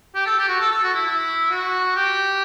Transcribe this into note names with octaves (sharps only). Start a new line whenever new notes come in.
G4
A4
G4
F#4
A4
A4
F#4
E4
E4
F#4
G4